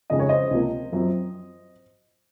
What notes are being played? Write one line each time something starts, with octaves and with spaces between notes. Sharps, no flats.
F2 C#3 G#3 D#4 D#5
C#5
C5 D#5
C#2 C3 F3 A#3
F#2 F3 C4